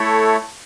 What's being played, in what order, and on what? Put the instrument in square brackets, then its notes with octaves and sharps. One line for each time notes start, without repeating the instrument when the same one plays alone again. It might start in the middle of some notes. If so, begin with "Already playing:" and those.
Already playing: [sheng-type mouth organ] A3 E4 A4 C#5